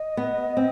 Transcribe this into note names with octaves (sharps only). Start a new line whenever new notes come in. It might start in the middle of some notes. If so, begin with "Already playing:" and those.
Already playing: D#5
B3
C4